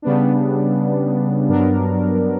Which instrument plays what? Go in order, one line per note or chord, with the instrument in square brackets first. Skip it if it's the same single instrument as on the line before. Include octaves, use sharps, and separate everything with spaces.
[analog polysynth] C#3 G3 B3 D4
G2 F#3 B3 D4 A#4